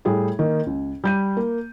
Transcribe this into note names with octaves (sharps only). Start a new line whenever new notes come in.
A2 G3 G#4 G5 G#5
D#3 A#3
C#2
G3 G6 D#7
A#3